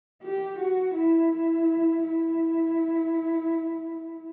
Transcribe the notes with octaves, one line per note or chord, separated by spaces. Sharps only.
G4
F#4
E4
E4
E4